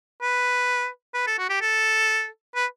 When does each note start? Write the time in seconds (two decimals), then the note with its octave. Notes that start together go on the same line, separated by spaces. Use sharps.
0.22 B4
1.14 B4
1.27 A4
1.39 F#4
1.50 G4
1.61 A4
2.55 B4